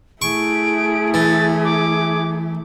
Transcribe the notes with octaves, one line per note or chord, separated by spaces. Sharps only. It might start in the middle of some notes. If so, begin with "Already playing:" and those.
A3 E4 G#4 C#6 D7
E3 A6
D6